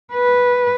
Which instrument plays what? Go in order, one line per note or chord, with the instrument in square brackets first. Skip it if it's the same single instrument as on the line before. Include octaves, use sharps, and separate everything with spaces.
[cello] B4